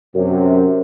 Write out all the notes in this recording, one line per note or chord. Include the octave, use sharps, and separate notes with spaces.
F#2 C3